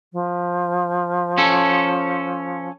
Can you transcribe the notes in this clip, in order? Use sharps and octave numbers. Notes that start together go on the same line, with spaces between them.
F3
C#4 A4